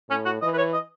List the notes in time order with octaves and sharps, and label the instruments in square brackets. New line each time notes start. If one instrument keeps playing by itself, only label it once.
[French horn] A2 [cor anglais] C#4
[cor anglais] F#4
[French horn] E3 [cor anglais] D#5
[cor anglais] B4
C#5
D#5